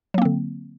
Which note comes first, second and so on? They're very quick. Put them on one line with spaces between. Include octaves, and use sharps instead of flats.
F#3 A#3 C4 D3